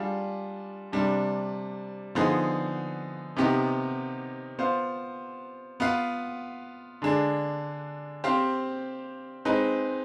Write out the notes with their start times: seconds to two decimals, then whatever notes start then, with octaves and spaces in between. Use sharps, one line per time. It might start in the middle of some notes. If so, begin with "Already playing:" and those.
Already playing: G3 D4 F4 G#4
0.92 C3 G3 D4
2.15 D3 F3 B3 D#4 G#4
3.37 C3 D#3 B3 D#4 G4
4.59 B3 F4 C5 F5
5.80 B3 F4 B4 F5
7.02 D3 G#3 D4 G#4
8.24 C4 G4 C5 F5
9.45 G#3 C4 D#4 B4